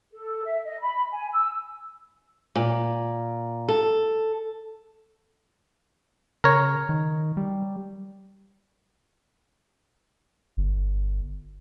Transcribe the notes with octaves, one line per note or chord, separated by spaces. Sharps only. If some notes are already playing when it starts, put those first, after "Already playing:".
A4
E5
D#5
B5
G#5
E6
A#2
A4
C#3 A#4 C#5
D#3
G3
G1